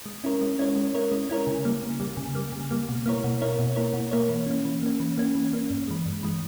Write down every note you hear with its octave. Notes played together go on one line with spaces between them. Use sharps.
G#3
C#4 E4 A#4 C#5
G#3
C#4 E4 A#4 C#5
G#3
C#4 E4 A#4 C#5
G#3
C#4 E4 A#4 C#5
C#3
G3 A#3
C#3
G3 A#3
C#3
G3 A#3
C#3
G3 A#3
B2
A#3 E4 A#4 C#5
B2
A#3 E4 A#4 C#5
B2
A#3 E4 A#4 C#5
B2
A#3 E4 A#4 C#5
E3
A#3 C#4
E3
A#3 C#4
E3
A#3 C#4
E3
A#3 C#4
G2
E3 G#3
G2
E3 G#3